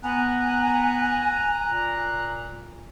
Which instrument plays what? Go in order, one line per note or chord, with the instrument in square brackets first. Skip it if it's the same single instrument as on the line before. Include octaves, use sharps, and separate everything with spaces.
[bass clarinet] B3 [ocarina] G#5 [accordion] A#5 F#6
[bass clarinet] A#2